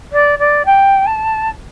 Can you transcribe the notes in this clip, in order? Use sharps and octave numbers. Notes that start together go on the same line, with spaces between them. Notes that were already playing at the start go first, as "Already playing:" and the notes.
D5
D5
G5
A5